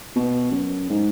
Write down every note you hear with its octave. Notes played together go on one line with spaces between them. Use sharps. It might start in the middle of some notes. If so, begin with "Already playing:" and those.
B2
F#2
G#2